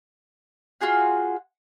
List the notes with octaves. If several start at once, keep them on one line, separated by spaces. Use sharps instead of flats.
F4 F#4 G#4 F#5